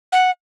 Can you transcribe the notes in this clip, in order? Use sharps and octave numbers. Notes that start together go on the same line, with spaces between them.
F#5